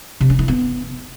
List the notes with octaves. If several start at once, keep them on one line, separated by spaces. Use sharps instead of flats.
C3
C#4
E4
B3